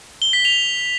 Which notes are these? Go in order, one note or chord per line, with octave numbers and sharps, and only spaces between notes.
G7
B6
F7